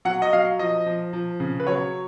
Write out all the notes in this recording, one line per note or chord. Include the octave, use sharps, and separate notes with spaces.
F#3 F#5
D#5
F#3 F5
F3 D#5
F3
F3
C#3
B4
F#3 C#5